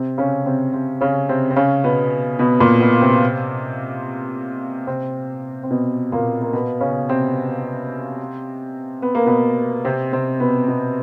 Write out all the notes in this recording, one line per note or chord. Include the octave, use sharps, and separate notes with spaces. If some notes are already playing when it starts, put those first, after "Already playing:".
Already playing: C3 C4
C#3 C#4
C3 C4
C3 C4
C#3 C#4
C3 C4
C4
C#3 C#4
B2 B3
B2 B3
A#2 A#3
B2 B3
C3 C4
C3 C4
C4
B2 B3
A#2 A#3
A#3
B2 B3
C#3 C#4
C3 C4
B3
A#3
B2 B3
C3 C4
C3 C4
B2 B3
B2 B3